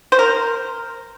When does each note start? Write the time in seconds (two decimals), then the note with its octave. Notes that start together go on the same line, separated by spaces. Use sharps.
0.12 C5
0.19 A#4